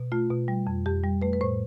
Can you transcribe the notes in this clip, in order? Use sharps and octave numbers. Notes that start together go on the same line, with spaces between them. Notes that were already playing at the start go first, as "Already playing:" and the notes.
Already playing: B2
A3 F4
B2
G3
F2
F2 G4
G3
A3 B4
B4
A2 C5